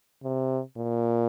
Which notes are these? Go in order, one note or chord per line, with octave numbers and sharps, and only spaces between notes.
C3
A#2